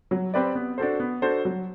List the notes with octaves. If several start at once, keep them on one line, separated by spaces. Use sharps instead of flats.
F#3
C4 G4 B4 D5
B3
D4 F#4 A4 C5
B3
D4 F#4 A4 C5
F#3